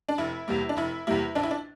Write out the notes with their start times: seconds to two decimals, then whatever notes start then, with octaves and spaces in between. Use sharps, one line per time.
0.09 D4
0.18 F1 E4
0.48 E2 C3 G3 A#3
0.69 D4
0.77 F1 E4
1.07 E2 C3 G3 A#3 E4
1.35 A#1 D4
1.43 E4
1.51 D4